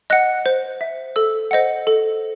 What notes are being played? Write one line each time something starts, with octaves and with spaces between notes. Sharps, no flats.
D#5 F#5 F#6
C5
E5
A4 E6
C5 D#5 F#5
A4